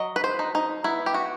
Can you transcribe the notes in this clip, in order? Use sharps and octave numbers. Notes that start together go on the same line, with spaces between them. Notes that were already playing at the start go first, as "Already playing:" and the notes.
Already playing: F#3 D#5
B4
C5
D#4
D#4
B3 E4
G4
F#4